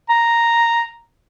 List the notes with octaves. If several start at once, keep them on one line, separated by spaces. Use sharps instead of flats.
A#5